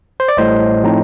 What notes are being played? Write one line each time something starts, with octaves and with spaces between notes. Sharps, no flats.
C5
D5
A1 A2 G3 C5 D#5
A2 F3 C4 D#4